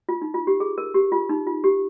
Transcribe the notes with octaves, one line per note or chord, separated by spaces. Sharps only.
F4
D#4
F4
G4
G#4
A#4
G4
F4
D#4
F4
G4